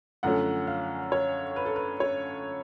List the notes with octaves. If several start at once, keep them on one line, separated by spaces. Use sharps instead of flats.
F#2 D3 F3 A3 C#4 F#5
F5
C#5
B4
A4
B4
C#5